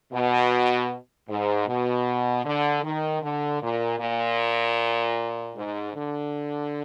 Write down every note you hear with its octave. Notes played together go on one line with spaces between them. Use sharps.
B2
G#2
B2
D3
D#3
D3
A#2
A#2
G#2
D3